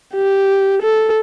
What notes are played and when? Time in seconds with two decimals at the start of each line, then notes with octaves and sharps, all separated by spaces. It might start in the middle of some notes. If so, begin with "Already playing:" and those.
0.15 G4
0.82 A4